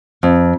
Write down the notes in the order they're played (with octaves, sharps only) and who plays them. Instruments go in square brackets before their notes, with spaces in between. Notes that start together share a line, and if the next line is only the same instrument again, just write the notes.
[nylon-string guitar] F2